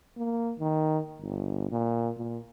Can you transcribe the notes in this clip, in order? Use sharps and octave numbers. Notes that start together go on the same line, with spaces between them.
A#3
D#3
G1
A#2
A#2